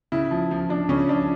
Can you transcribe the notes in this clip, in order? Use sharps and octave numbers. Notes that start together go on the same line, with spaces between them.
C#3 E4
F3
F3
F3 D4
C#3 C#4
F3 D4